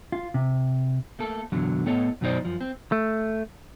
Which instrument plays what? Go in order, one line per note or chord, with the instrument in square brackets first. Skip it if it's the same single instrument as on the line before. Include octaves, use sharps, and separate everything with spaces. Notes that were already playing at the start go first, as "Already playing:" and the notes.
[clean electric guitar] F4
C3
[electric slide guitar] A3 A#3 A4
F#2 B2 D3 E3 F#3
A2 B3 A4 C#5 D#5
F#2 B2 F#3 D#4 C5 D5
F#2 F3
C4
[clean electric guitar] A3